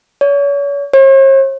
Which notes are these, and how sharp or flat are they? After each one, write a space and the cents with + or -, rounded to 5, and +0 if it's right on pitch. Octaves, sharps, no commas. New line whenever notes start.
C#5 +35
C#5 -45